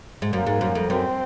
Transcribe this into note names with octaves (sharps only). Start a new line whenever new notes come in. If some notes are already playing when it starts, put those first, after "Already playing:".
G#2
F#2 A#3
G#2
F#2
F2
F#2 C4